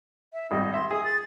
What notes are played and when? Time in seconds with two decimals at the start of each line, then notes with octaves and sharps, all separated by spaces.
0.33 E5
0.51 G#1 G3 D#5
0.74 E5 C6
0.91 G#4 D#6
1.04 A6